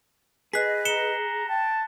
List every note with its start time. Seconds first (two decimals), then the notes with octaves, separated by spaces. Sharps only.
0.53 G#4 B4 D#5 F#6 B6
0.85 A#5 C#7 E7 G7
1.48 G5 A5